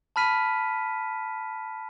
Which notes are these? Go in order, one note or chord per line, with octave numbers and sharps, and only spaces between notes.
A5 B5 F6 B6 D#7